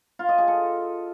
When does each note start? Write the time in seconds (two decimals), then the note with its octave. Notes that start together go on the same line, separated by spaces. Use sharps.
0.19 F4
0.29 D#5
0.38 G#4
0.48 A4